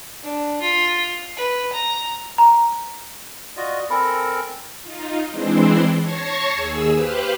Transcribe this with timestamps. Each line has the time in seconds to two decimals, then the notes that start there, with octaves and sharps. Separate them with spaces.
0.23 D4
0.61 F4
1.36 B4
1.72 A#5
2.38 A#5
3.57 F4 F#4 D5 D#5
3.90 C4 A4 A#4 G#5 B5
4.82 D#4 F4
5.30 E3 G#3 C4 D4 E4 C5
6.00 C#5 A5 C#6 G#6 A#6 C7
6.54 D#2 G#4 E6
6.92 G4 B4 C5 F5 F#6